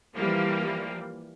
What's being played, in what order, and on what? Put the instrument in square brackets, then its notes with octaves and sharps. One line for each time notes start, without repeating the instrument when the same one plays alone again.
[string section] E3 F3 G3 A#3